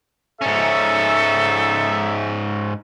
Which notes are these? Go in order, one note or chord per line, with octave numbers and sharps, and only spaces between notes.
G#2 C#4 D#4 A4 E5